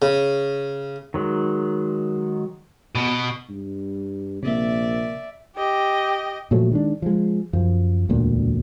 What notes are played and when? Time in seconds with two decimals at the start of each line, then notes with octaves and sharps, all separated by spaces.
0.02 C#3
1.14 D#3 F#3 G#3
2.95 B2
3.49 G2
4.43 A#1 C3 A#3 D5 E5
5.56 G4 D#5
6.51 A#2 F3 F#3 A3
6.72 D#3 G#3 D4
7.02 F3 G#3
7.53 F#2 F3
8.09 E1 D2 A#2